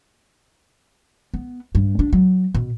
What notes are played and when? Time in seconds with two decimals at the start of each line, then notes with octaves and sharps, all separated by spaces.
1.34 B3
1.75 G2
1.99 D4
2.13 F#3
2.55 B2